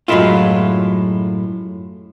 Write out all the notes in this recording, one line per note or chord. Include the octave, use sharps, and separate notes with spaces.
F#2 A2 C#3 G#3 E4 F4